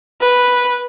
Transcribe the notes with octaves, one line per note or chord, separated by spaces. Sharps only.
B4